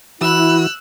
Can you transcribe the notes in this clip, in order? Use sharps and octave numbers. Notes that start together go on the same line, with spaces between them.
E3 E4 F#4 E6 F#6